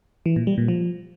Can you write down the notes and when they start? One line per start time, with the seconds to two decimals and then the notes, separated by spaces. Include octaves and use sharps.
0.26 E3
0.36 A#2
0.47 G3
0.58 A#2
0.68 F3